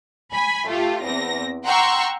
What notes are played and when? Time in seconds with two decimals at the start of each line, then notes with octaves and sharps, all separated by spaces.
0.32 G#5 B5
0.67 A3 F4 G4
1.04 E2 C4 A#6
1.65 F#5 G5 A#5 C6 C#6 E6